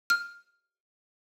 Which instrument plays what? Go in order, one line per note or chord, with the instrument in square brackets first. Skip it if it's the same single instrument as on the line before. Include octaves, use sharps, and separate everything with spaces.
[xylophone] F6